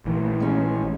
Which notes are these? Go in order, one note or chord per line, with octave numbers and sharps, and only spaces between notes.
A#1 E3 A3
G#3 C#4